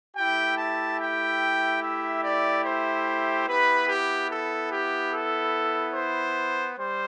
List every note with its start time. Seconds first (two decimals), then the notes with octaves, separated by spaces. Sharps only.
0.15 A3 E4 G4 G5
0.56 A5
0.98 G5
1.80 E5
2.22 D5
2.64 C5
3.46 B3 E4 G4 B4
3.87 G4
4.28 A4
4.70 G4
5.11 A4
5.93 C5
6.76 G3 C5